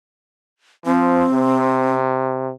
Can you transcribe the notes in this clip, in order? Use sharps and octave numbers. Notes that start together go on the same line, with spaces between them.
F3 C4
C3